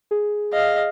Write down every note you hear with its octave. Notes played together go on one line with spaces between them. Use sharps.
G#4
D#5 F5